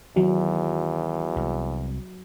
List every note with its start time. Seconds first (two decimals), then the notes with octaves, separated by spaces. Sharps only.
0.16 E2 D#3 F#3
1.36 C2